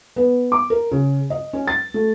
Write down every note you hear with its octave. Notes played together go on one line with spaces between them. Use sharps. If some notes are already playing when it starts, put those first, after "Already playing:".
B3
D6
A#4
C#3
D#5
C#4
A6
A3